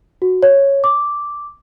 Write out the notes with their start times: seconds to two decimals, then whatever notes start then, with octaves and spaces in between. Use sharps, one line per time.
0.22 F#4
0.43 C#5
0.84 D6